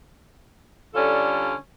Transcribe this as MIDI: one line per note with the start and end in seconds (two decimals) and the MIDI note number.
0.95 1.54 50
0.95 1.54 55
0.95 1.54 61
0.95 1.54 65
0.95 1.54 69